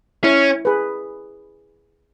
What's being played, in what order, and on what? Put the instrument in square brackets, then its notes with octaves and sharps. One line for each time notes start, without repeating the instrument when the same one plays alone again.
[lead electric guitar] C#4 [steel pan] E4
[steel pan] G#4 B4